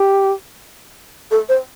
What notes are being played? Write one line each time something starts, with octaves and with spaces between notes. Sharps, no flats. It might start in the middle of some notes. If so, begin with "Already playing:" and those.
Already playing: G4
A4
C5